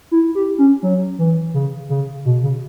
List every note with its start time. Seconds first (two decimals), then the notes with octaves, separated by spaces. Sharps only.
0.11 E4
0.35 G4
0.58 C#4
0.83 F#3
1.19 E3
1.54 C#3
1.90 C#3
2.25 B2
2.43 C#3